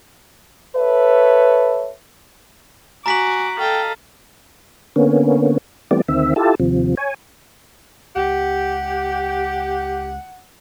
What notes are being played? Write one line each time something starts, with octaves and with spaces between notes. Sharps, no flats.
A4 B4 C#5 E5
F#4 G#5 A#5 D6 B6 F#7
A4 D#5 F5 G5
D3 A#3 B3 C#4
E3 G3 A3 B3 C4 D5
D2 D#3 C4 E5
E4 F4 G4 A4 A5
D#2 C3 F3
C#5 G#5
C#2 G4 F#5